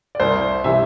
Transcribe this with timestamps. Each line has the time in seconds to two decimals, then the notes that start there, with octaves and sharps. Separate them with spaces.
0.15 D5
0.20 C2 C5
0.64 C3 E3 E5